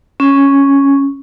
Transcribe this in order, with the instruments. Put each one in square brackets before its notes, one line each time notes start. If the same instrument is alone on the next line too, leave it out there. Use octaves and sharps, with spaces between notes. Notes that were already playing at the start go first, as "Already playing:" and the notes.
[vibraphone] C#4